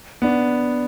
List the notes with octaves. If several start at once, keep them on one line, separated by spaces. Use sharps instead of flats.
B3 D4